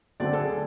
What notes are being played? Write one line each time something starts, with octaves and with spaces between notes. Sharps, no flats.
D3 F#3 A3 C4 D5
A4
G#4